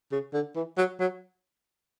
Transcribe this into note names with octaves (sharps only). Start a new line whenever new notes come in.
C#3
D3
E3
F#3
F#3